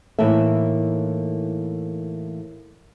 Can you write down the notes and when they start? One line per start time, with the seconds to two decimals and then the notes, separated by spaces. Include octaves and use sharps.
0.19 A2 E3 A#3 D#4 A4 E5